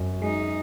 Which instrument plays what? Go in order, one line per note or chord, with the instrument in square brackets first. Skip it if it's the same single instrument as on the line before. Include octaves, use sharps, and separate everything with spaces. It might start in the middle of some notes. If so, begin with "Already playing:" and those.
Already playing: [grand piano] F#2 F#4
[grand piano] G#3 [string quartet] D#4